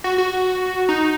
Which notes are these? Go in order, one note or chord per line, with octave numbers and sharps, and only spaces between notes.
F#4
F#4
D#4